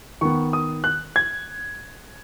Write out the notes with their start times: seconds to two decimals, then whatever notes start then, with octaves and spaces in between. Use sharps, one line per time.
0.21 D#3 B3 C#6
0.53 D#6
0.84 F#6
1.16 G#6